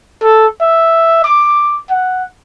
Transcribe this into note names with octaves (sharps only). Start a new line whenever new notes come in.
A4
E5
D6
F#5